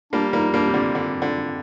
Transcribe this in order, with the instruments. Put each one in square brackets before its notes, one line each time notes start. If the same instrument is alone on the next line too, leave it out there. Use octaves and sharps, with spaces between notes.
[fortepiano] G3 A#3 [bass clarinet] D4
[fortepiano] G3 A#3 [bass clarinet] D#4
[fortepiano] G3 A#3 [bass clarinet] D4
[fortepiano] C3
[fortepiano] D3 [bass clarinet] C4
[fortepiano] D3
D3